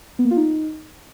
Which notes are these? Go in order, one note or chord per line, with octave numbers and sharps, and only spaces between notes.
B3
A#3
F4
D#4